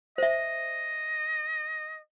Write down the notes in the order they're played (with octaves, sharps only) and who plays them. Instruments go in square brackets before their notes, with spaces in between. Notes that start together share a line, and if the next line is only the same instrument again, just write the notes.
[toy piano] C5 E5 [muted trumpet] D#5